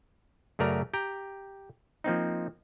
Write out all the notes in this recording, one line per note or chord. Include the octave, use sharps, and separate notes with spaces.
F#2 C#3 A3 A#4 D5 A#5
G4 G5 A#5
F3 A#3 C4 D#4